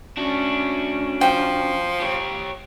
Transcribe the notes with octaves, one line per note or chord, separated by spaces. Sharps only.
C#4 D4 F#4
F3 G5
G4 C#5